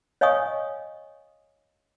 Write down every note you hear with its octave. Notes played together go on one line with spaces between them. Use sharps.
C#5 D#5 F5 G#5 C#6 D#6